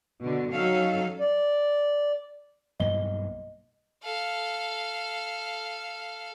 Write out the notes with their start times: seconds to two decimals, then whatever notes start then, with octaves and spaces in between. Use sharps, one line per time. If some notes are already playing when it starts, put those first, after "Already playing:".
0.21 B2 D3
0.53 F#3 C#4 D#4 A4 F5
1.20 D5
2.80 B1 G2 A#3 D#5 G7
4.03 A4 F5